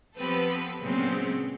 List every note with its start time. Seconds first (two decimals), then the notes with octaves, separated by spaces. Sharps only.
0.17 F3 B3 C4 G4 A4 B4
0.81 A#2 C#3 F#3 G#3 B3 C4